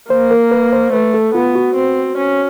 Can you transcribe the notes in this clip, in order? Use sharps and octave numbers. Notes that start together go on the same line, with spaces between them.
A#3 C5
A#4
B4
C5
A3 B4
A4
B3 F4
F#4
C4
C#4